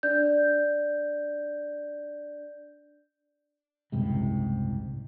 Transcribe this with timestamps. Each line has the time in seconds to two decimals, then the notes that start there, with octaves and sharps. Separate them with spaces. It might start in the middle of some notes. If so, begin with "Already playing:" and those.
0.03 D4 D5 G6
3.92 F#1 C2 G#2 C3